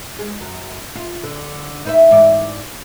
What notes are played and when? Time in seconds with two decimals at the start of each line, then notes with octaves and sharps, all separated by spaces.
0.19 G#3
0.41 F#2
0.95 F4
1.24 D3
1.85 D#4 B4 E5
2.11 G#2 E3 D5